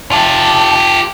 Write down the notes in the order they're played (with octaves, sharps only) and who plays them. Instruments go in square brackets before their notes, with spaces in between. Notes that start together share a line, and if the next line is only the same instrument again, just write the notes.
[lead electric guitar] F4 G4 [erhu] A5